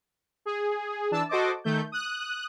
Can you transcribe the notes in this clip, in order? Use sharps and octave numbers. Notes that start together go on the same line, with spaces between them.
G#4
E3 D4 A5 E6
F#4 A4 C5 D#5 A5 D6
D#3 A3 G6
D#6 F#6